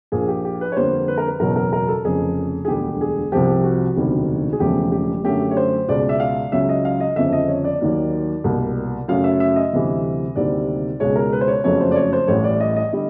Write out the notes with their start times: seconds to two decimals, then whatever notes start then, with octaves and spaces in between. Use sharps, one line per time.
0.12 A#1 A#2 F3 G#4
0.28 G4
0.45 G4
0.61 B4
0.72 C#5
0.76 F2 D3 G3 A#3 C5
1.08 B4
1.18 A#4
1.27 B4
1.40 F#1 E2 B2 F#3 A#4
1.56 A#4
1.73 A#4
1.88 A4
2.04 F1 F2 C#3 G#4
2.65 G#4
2.68 E1 D2 D3 G3 G4
3.01 G#4
3.32 C2 C3 F3 G4
3.64 F#4
3.96 E1 D2 C3 D#3 G3
4.52 G#4
4.60 E1 E2 C#3 F3 A3 G4
4.92 G4
5.24 F#2 D3 F#3 A3 G4
5.51 C#5
5.57 C5
5.88 C#2 B2 G#3 D5
6.09 E5
6.20 F5
6.52 C#2 C#3 F#3 E5
6.69 D#5
6.85 F5
7.00 D#5
7.16 G1 F2 C#3 F3 E5
7.32 D#5
7.48 C#5
7.64 D5
7.81 D#2 D#3 F#3 A#3
8.44 C2 B2 G3 A#3
9.08 F#2 C#3 F#3 A3 F5
9.24 E5
9.40 E5
9.56 D#5
9.73 D2 C3 E3 G3
10.36 D2 C3 D#3 G3 A#3 D5
11.00 C#2 B2 G#3 C#5
11.16 A#4
11.32 B4
11.41 C5
11.48 C#5
11.64 F#1 F2 C#3 F#3 A3 C#5
11.80 C5
11.91 D5
11.96 C#5
12.13 C5
12.28 A1 A2 E3 G3 C#5
12.44 D5
12.60 D#5
12.76 D#5
12.93 D3 G3 D#5